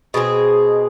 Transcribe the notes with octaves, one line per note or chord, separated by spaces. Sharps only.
B2 G#3 C4 G#4